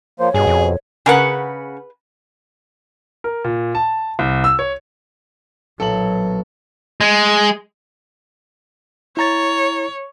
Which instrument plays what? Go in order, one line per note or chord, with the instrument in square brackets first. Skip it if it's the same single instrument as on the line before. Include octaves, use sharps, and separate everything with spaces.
[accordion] F3 A#3 C5 [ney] C#5
[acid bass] G2 [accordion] B2 [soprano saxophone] G#4
[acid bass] F2
[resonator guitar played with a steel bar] C#3 F#5 [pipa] G#4 A#4 B4
[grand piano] A#4
A#2
A5
C2
E6
C#5
[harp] B1 A#2 [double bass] F#3 [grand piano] A4 F#7
[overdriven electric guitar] G#3
[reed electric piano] E4 A#5 A6 [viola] C#5